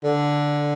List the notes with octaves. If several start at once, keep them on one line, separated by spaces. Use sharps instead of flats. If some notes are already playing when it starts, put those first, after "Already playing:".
D3